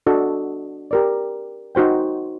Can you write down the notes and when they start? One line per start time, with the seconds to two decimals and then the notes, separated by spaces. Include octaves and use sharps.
0.07 D4 F#4 A4 D#5
0.91 G4 A#4 D5
1.75 D#4 F#4 C5 G5